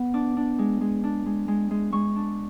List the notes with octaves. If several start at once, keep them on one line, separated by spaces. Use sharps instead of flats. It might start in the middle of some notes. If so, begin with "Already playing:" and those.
Already playing: B3
D4 D6
D4
G#3
G#3
D4
G#3
G#3
G#3
G#3 C#6
D4